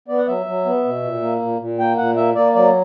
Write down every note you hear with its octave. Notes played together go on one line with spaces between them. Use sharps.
B3 D5
F#5
F#3 E5
F#3
B3
B2
A#2
A#3
A#2
A#2
A#3 G5
A#2 F#5
A#3 E5
A#3 D5
F#3 D5